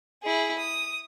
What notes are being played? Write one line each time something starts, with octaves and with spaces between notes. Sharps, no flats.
E4 G#4
D#6